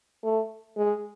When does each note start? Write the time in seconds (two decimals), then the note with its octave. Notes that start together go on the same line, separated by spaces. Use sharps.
0.23 A3
0.77 G#3